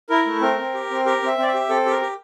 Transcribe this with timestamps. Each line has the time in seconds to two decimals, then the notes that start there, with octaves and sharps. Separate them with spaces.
0.09 E4 A#4
0.27 A3
0.41 C4 A#4
0.58 C4
0.74 G4
0.90 C4
1.05 G4 A#4
1.22 C4 E5
1.38 C4 D5
1.48 E5
1.54 G4
1.69 C4 A4
1.86 G4
1.91 A#4
2.01 G4